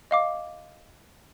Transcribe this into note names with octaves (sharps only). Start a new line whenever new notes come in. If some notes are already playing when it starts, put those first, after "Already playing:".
D#5 F5 D6